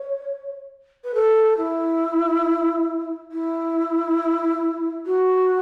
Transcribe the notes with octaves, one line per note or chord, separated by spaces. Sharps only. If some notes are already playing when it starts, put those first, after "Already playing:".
Already playing: C#5
B4
A4
E4
E4
F#4